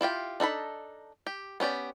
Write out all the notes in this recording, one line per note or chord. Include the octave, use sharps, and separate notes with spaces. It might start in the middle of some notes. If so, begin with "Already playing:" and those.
E4 F4 G4 G5
D4 D#4 A4 B5
G4
B3 C#4 G4 D5